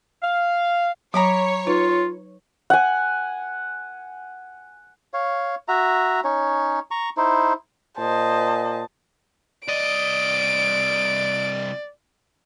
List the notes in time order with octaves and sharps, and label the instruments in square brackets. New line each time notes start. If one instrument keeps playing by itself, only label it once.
[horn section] F5
[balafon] F#3 [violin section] C#5 [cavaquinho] A#5 B5 D6
[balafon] D#4 B4 [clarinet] F4
[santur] F#5 G#5
[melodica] C#5 F5
F#4 E5 A#5
C#4 D#4 C#5
A#5 C#6
D#4 E4 C5
[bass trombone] A#2 [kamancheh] C5 D#5 [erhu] A5
[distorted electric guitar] C2 D#5 [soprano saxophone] D5 [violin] D7